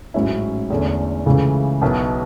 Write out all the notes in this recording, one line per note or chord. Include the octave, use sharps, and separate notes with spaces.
A1 G#2 F#3 C#4 E4
E2 D3 A3 C#4
C#2 C#3 E3 A3
B1 B2 F#3 B3 E4